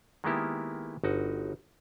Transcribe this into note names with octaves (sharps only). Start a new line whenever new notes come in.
D#3 G#3 A#3 B3 E4 G4
G1 D#4 F#4